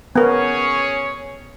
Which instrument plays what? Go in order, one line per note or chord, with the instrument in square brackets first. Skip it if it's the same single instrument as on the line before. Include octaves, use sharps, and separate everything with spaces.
[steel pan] B3 A#4 [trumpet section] C#4 G#4 C#5